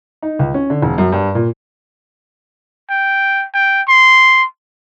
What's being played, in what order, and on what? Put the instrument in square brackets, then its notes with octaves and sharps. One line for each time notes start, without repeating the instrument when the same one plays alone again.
[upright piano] D#4
C#2
C#4
D3
E1
F#2
G2
A#2
[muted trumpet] G5
G5
C6